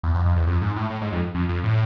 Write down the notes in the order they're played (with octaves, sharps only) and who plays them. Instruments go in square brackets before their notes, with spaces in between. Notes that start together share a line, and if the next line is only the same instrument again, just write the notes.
[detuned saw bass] E2
F2
F2
E2
F2
G#2
A2
A2
G#2
F2
F2
F2
A2